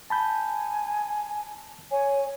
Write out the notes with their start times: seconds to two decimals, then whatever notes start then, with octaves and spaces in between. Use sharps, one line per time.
0.10 G#5 A5 B5 G6
1.91 C#5 G#5